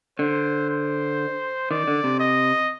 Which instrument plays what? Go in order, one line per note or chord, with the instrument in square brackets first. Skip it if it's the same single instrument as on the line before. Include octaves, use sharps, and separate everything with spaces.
[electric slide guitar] D3 [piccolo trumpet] C5
[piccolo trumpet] C5
[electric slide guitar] D#3 [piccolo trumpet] D5
[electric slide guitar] D3
C3
[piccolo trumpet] D#5